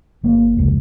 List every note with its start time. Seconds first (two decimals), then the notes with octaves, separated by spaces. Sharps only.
0.23 G1 A#3
0.57 F1 C#2